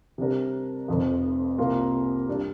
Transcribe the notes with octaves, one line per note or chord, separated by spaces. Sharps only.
C3 G3 D4 A#4
F1 F2 F3
C2 C3 A#3 F4 A#4
G2 G3 D4